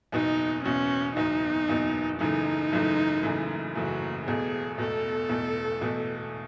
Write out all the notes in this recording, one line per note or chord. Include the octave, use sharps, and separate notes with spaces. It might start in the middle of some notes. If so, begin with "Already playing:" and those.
F#1 E2 B2 D#4
F#1 E2 B2 C#4
F#1 E2 B2 D#4
F#1 E2 B2
F#1 F#2 C#3 E3 A3 D#4
F#1 F#2 C#3 E3 A3
F#1 F#2 C#3 E3 A3
F#1 F#2 C#3 E3 A3 F#4
E1 E2 B2 A3 G#4
E1 E2 B2 A3 A4
E1 E2 B2 A3
E1 E2 B2 A3